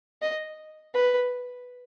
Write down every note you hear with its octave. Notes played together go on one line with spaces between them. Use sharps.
D#5
B4